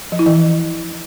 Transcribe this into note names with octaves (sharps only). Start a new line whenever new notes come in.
F3
E4
E3